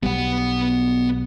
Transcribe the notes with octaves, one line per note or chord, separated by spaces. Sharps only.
B1 G3 B3 F#5